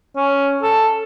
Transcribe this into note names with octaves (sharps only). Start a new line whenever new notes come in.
C#4
A4